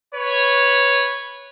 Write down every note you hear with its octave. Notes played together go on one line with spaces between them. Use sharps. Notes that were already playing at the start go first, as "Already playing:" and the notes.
B4 C#5